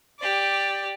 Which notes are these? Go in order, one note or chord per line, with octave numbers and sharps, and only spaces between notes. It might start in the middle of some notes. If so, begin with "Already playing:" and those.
G4 D5